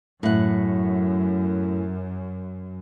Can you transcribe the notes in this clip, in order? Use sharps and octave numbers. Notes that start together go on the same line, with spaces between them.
F#2 A2 F#5